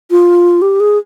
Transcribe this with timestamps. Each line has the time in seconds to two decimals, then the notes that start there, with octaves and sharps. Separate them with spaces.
0.11 F4
0.62 G4
0.80 G#4